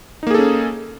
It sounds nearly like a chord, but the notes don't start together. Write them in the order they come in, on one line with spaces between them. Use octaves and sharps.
D#4 A#3 G#4 A4 C#4